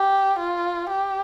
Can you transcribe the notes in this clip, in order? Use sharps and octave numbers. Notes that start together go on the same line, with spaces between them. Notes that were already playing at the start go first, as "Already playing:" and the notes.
Already playing: G4
F4
G4